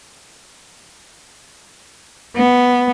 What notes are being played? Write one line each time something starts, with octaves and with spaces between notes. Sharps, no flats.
B3